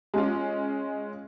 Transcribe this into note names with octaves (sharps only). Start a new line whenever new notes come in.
G#3 C#4 F4